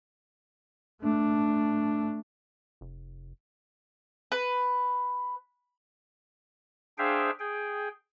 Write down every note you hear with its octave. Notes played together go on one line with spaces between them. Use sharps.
A3 D4
F1
B4
D4 G#4 C5 E5 F5 G5
G#4 G5